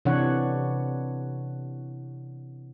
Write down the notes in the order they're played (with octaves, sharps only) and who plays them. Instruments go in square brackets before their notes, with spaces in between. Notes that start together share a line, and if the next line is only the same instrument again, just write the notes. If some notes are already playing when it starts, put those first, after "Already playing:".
[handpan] C3 E3 D4 C#5 F#5